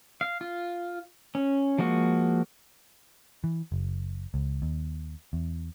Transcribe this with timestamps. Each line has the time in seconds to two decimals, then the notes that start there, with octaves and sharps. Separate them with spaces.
0.21 F5
0.41 F4
1.35 C#4
1.78 F3 G#3 A#3 F#4
3.44 E3
3.72 F#1
4.34 C#2
4.62 D#2
5.33 E2